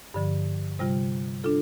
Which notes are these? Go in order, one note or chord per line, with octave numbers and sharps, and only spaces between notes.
G2 D3 F3
C3 G3 F4
D4 F4 A4